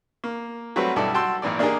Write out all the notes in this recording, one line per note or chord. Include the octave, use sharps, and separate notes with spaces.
A#3
F#3 G3 A3 C4 F#4 B4
B1 G2 E4 A4 D5 A5
F#4 G5 A5 C6 E6
G#1 A#2 E3 D5
A#3 D4 D#4 G4 G#4 A#4